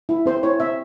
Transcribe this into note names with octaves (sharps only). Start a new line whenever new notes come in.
E4
C4 C5
E4 C#5
C4 E5